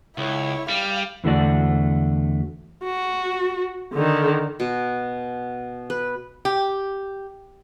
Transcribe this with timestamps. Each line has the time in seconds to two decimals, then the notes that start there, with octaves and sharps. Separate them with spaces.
0.18 C#2 E4 C#5
0.69 G3 F5 F6
1.24 E2 D3 A3 F#4 D5
2.84 F#4
3.93 D3 D#3
4.60 B2
5.90 B4
6.45 G4